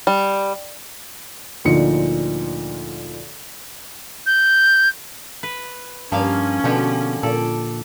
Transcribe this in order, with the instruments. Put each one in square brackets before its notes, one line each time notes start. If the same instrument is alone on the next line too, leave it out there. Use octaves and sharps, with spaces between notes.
[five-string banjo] G3
[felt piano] D2 A#2 D3 F3 D#4 C#7
[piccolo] G6
[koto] B4
[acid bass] G2 [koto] F3 A#3 F5 [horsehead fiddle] C#4
[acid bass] B2 [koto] D3 F3 G4
[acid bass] A#2 [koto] A4 D5